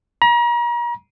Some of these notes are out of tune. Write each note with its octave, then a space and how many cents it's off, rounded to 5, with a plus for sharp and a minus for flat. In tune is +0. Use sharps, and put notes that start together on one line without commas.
A#5 +40